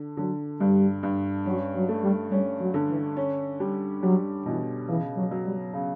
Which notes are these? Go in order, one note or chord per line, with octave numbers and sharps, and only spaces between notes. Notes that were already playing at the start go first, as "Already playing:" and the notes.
Already playing: D3
D3 F#3
G2 G3
G2
F#3 C#4
F#3
A3
G3
G3 C#4
F#3
D3
E3
C#4
G3
F#3 G3
B2 E3
C#3 E3
F#3
F#3
G3
C#3